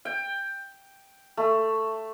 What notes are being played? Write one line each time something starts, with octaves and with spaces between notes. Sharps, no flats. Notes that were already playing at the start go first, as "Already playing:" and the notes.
G5
A3